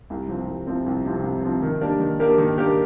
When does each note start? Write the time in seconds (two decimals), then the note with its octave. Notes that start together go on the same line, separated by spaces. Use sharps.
0.10 C2
0.28 C3 F3 C4
0.47 C2
0.67 C3 F3 C4
0.86 C2
1.05 C3 F3 C4
1.24 C2
1.43 C3 F3 C4
1.62 D#3
1.81 A#3 D4 G4 A#4
2.00 D#3
2.20 A#3 D4 G4 A#4
2.38 D#3
2.58 A#3 D4 G4 A#4